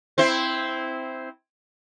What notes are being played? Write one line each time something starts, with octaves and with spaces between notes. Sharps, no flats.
C4 E4 C5